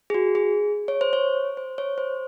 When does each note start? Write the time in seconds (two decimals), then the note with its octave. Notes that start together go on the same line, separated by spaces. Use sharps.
0.10 G#4
0.14 F#4
0.35 G#4
0.88 C#5
1.01 C5
1.13 C#5
1.57 C5
1.78 C#5
1.98 C5